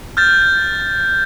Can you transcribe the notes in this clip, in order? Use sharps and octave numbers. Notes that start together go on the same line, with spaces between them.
F6 G6 A6